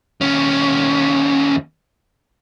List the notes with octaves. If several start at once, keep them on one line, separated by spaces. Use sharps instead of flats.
D#2 C#4